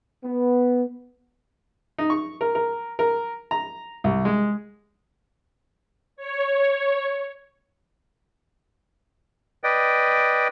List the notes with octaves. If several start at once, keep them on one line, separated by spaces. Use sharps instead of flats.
B3
D#4
C#6
A#4
A#4
A#4
A#5
C2
G#3
C#5
B4 D5 D#5 G5